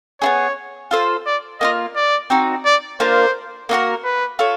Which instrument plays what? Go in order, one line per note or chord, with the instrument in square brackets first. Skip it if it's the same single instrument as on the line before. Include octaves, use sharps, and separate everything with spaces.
[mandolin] B3 E4 G#4 [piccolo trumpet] C#5
[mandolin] F4 A4 C5
[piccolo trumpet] D5
[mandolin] A#3 D4 F4 [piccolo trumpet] D#5
[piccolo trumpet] D5
[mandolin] C4 D#4 F#4
[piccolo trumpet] D5
[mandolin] A#3 D4 F4 A#4 [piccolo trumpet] C5
[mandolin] A#3 D#4 F#4 A#4
[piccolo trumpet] B4
[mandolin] F4 A4 C#5